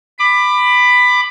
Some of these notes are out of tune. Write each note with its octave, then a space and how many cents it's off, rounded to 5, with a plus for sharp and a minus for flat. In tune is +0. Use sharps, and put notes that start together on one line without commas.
B5 +10 D6 +25